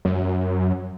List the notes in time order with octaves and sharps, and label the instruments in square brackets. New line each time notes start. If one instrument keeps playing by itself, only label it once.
[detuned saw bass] F#2